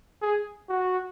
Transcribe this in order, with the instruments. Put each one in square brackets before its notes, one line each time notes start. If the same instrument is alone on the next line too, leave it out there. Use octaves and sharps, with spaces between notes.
[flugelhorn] G#4
F#4